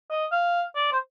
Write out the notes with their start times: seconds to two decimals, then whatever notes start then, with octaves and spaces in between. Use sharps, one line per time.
0.10 D#5
0.32 F5
0.75 D5
0.92 C5